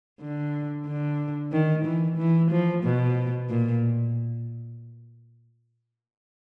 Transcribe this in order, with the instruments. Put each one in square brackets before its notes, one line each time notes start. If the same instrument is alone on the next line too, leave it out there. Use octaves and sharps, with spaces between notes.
[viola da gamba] D3
D3
D#3
E3
E3
F3
B2
A#2